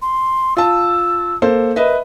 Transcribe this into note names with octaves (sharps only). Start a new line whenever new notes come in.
C6
F4 A5 E6
A#3 A4 C5
A#4 B4 D#5 E5